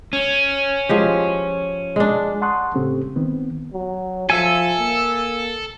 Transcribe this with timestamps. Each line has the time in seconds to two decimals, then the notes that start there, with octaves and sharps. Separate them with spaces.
0.13 C#4
0.89 F3 G#3 G4
1.96 G#3 D4
2.42 F#5 A5 C6 C#6 D#6 F#6
2.75 A2 C#3 C4 C#4 G4 A4
3.16 D#3 B3 C4
3.73 F#3
4.30 F3 A4 E5 G#5
4.80 A#3